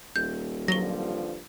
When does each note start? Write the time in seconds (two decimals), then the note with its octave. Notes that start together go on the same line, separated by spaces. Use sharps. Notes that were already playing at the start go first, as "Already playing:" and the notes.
0.16 D#1 G6
0.68 G2 D3 F3 F#3 A#6 G7